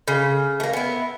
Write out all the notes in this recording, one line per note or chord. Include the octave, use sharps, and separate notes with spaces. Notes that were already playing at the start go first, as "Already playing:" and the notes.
C#3
A3 A#3
B3 E4